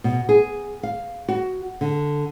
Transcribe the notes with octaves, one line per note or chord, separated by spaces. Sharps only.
B2
G#4
F5
F#4
D3